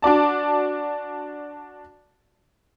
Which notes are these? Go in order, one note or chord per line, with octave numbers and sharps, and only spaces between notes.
D4 F#4 D5 A5